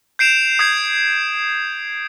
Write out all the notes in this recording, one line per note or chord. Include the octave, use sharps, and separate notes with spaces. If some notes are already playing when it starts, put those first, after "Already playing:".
G6 C7 D7 E7 F7
D#6 G6 G#6 C7